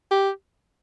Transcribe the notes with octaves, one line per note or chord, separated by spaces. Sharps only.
G4